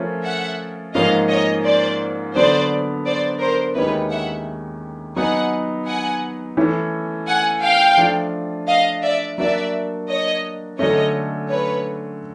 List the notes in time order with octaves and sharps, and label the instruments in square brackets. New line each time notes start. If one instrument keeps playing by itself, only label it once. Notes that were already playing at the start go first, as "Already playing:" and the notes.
Already playing: [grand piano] F3 A3 C#4 F4 A#4
[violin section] E5 F#5
[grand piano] G#2 F3 A#3 C#4 F4 [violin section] D#5 F5
[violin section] C#5 D#5
C5 D5
[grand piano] D3 F#3 B3 D4 [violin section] C5 D5
[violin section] C5 D5
A#4 C5
[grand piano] D#2 D#3 G#3 C#4 E4 [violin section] B4 C#5
[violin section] E5 F#5
[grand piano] F#3 B3 D#4 [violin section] F#5 G#5
[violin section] F#5 G#5
[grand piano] E3 A3 C#4
[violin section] F#5 G#5
F5 G5
[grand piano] F3 A3 D4 F4
[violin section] D#5 F5
D5 E5
[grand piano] F#3 A#3 D4 F#4 [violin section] D5 E5
[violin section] C#5 D#5
[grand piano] D3 F#3 A3 C#4 [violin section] C#5 D#5
[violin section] B4 C#5